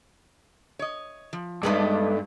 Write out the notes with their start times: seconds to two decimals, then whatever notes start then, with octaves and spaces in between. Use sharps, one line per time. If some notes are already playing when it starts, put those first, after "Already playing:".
0.79 C#5 D#5
1.33 F3
1.63 G2 G#3 A3 B3 D#4 A4 D5